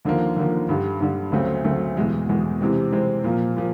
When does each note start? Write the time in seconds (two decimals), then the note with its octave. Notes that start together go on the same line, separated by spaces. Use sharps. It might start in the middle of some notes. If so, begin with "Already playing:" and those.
0.05 D#2 D3 F3 A#3
0.36 D#2 D3 F3 A#3
0.69 G2 D3 G3
1.00 G2 D3 G3
1.32 D2 C#3 F#3 A3 C4
1.64 D2 C#3 F#3 A3 C4
1.97 E2 B2 G#3
2.29 E2 B2 G#3
2.61 C3 E3 G#3 C4
2.92 C3 E3 G#3 C4
3.24 A#2 F3 A#3
3.56 A#2 F3